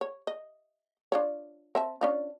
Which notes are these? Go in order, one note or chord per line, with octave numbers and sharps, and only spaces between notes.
C#5
D#5
D4 F4 C#5
C4 E5 A5
C#4 D4 F4